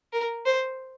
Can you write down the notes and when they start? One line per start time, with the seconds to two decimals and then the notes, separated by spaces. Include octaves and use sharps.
0.13 A#4
0.45 C5